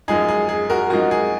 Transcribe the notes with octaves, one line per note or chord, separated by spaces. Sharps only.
F#2 F3 G#3 D#4 G#4
G#4
G#4
F#4 A#4
F#2 F3 G#3 D#4 F#4
G#4